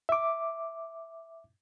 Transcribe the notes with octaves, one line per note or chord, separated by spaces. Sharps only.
E5 D6